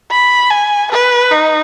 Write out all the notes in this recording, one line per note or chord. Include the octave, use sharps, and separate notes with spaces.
B5
G#5
B4
D#4